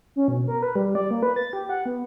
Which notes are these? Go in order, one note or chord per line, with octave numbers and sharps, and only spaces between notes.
C#4
B2
A#4
B4
G3
D5
A#3
B4
A6
G4
F#5
B3